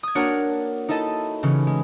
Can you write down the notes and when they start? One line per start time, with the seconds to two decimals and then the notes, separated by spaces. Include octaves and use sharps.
0.03 D#6 G#6
0.15 A#3 D4 F#4 A#4 C#5 F#5
0.88 D#4 E4 A4 D#5 A5
1.43 C#3 E3 C#4
1.67 G#3